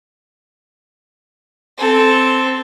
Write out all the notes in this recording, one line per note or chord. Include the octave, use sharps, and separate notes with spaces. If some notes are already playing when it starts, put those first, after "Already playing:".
C4 A4